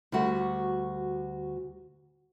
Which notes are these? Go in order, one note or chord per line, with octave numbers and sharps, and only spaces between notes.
D2 G3 F#4 F#5